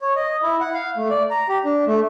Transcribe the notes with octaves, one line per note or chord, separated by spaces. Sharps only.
C#5
D#5
E4
F#5
F5
A3
D5
A#5
G4
D4
A3